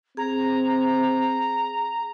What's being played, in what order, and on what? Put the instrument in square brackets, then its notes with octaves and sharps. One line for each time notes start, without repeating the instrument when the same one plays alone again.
[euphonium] C4 [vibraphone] G#4 [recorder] A#5